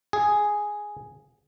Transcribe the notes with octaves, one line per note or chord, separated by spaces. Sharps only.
G#4